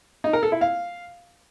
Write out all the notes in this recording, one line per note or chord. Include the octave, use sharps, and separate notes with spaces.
D#4
A#4
A4
E4
F5